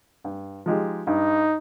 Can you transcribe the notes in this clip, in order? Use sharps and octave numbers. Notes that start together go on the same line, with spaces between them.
G2
F3 G#3 D#4 G4
G2 D#4